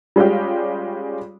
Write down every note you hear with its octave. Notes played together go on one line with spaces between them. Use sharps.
G3 G#3 C#4 F4 G4